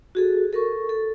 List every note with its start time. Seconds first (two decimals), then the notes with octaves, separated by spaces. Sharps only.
0.15 F#4 G#4 A4
0.53 A4 A#4 C#6
0.89 A4